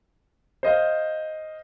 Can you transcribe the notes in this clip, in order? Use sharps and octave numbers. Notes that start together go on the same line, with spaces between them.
C5 D#5 F5